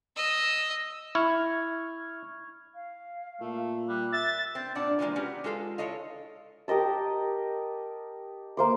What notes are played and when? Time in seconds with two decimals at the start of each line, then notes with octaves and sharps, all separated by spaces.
0.17 D#5 E6
1.15 E4 C#6 F6 G#6
2.74 F5
3.41 A#2 A3
3.89 G3 F#6
4.12 E5 A6
4.55 C4
4.75 A#2 D4 F#5
4.99 B2 E3 F3 G#3 A#3
5.16 B3 C#4 F#4 G4
5.44 G#3 F4 A4 F5
5.78 E4 A4 C#5 D#5 F5
6.68 G4 A#4 D#5 A5
8.57 A#3 C5 D6